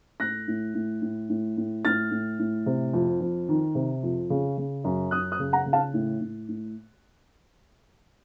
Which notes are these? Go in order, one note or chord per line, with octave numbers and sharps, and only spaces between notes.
A2 F#6 A#6
A2
A2
A2
A2
A2
A2 F6 A6
A2
A2
C3
F2
F2
D#3
C3
F2
C#3
C#3
F#2
F#2 D#6 F#6
D#6 F#6
C#3
F#5 A#5
C#3
F5 A5
A2
A2
A2